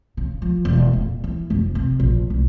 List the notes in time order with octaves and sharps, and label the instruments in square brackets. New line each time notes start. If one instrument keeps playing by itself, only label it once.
[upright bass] C#3
F3
E1
D#1
E3
F1
C3
A#1
C2